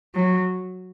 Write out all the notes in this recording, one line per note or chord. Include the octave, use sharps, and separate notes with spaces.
F#3